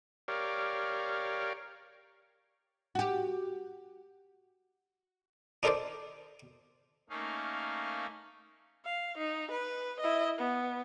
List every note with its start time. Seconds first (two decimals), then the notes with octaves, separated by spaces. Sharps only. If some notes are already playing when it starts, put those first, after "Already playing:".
0.28 G4 A#4 C#5 D5 F5
2.95 F#4 G4
5.63 D4 D#4 A4 A#4 C5 D5
7.09 A3 A#3 C#4 D#4 F5
8.85 F5
9.18 D#4
9.51 B4
10.00 E4 D#5
10.38 B3